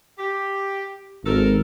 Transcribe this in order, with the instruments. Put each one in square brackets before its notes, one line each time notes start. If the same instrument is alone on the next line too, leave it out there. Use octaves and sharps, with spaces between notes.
[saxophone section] G4
[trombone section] G#1 [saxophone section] A4 A#4